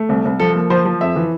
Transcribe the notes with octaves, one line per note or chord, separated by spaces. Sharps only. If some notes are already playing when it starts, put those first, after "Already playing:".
Already playing: A3
C2
C2
F3 A4
A#3
F3 C5
F3
F2 E5
E3